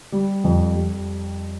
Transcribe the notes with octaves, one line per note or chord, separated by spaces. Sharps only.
G3
F2
G3